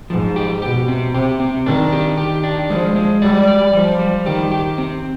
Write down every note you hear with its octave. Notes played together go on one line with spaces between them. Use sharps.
G#2 F3
G4
B2 G4
C4
C3 G4
C4
D#3 D4
G4
D#3 G4
D4
F3 G#3
G#3
G3 D5
D5
F3 G3
G3
D#3 G4
G4
C4